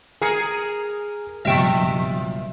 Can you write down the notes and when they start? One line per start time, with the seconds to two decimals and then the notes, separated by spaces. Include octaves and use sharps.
0.22 G#4 A#4 G#5 C7 C#7
1.45 F#1 G2 B2 F3 D#5 E5 G5